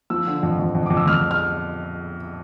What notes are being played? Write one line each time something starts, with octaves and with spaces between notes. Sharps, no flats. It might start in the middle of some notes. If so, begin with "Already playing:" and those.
F3 E6
D3
F2
F2
F2
F2 D6
E6
F2 F6
F6